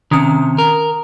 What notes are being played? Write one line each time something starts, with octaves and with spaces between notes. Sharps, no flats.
C3 D#3 C#4 D#6
A#4